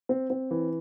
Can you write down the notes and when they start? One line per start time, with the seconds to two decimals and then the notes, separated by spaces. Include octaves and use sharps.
0.09 C4
0.30 C4
0.51 E3